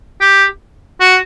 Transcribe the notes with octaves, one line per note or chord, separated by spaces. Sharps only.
G4
F#4